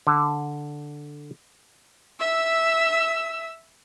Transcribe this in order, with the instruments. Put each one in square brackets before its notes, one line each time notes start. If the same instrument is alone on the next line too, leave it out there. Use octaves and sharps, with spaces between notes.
[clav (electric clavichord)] D3
[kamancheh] E5 E6